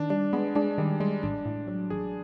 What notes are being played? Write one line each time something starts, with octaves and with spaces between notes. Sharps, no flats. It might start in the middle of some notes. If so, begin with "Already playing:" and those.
Already playing: D#3 D4
G3 D4
G#3 B3
G#3 D4
D#3 G3
G3 G#3
A1 D4
A2
F#3
A1 G#4